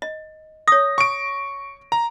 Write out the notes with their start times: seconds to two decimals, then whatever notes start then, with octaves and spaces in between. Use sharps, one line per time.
0.02 D#5
0.68 C#5 D#6 A#6
0.98 C#6 D7
1.92 A#5